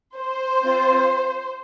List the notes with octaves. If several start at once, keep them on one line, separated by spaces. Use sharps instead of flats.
C5
C4 F4